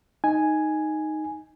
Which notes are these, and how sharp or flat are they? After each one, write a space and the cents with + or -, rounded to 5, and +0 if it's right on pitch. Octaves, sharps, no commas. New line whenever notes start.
D#4 +0 G#5 +0